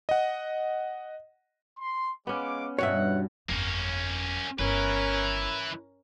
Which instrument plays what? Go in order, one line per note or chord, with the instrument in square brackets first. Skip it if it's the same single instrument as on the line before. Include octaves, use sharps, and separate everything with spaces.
[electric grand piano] D#5 F#5
[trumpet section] C6
[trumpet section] G#3 F5 D6 [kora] B3 C#4
[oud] E2 G2 B2 [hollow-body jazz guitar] C#5 E5 [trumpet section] F#5
[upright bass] G1 F2 [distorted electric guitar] A#3 C#4
[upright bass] G1 [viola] C#4 A#4 [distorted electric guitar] E4 B4